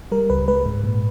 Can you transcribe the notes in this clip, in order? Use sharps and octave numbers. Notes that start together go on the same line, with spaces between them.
G3 A#4
C#2 B4
G#3 B4
G#2
A#2